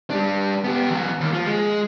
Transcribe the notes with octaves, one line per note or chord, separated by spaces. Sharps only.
G3 D4
B3 G4
E2 F#3
D#2 A#3
F3
G#3